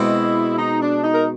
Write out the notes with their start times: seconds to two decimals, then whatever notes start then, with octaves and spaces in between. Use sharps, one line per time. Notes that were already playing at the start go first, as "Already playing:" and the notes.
Already playing: B2 G#3 C4 E4
0.58 D#4
0.81 D4
1.03 D#4
1.15 A#4